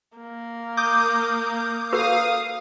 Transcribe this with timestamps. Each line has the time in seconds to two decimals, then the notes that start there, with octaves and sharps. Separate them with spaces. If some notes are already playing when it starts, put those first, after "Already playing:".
0.17 A#3
0.77 D6 D#6 G6
1.93 F#4 A4 B4 F5 D#6